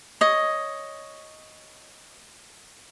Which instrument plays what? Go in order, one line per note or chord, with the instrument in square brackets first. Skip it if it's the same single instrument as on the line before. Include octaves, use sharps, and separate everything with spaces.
[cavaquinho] C#5 D#5